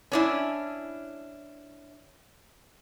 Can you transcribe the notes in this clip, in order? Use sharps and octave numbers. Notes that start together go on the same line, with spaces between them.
C#4 D4 E4